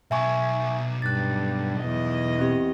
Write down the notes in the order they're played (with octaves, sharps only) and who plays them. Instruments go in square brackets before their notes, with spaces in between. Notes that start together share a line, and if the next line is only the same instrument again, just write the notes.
[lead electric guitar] B1 F#3 [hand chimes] E5 G#5 C#6
[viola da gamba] G2 [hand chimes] F#6 A6
[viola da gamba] E2 D#5
[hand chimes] C4 G4